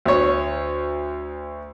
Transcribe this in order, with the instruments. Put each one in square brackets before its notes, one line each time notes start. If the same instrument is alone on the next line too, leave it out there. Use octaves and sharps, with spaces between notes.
[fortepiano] D2 C#5